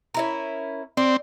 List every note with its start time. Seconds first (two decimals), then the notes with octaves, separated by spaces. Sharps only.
0.14 C#4 E4 A#4
0.97 C4 D5